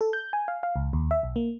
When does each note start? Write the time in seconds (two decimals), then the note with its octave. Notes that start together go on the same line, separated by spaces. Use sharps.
0.01 A4
0.13 G6
0.33 G#5
0.48 F5
0.63 F5
0.76 C#2
0.93 D#2
1.11 E5
1.23 B1
1.36 A#3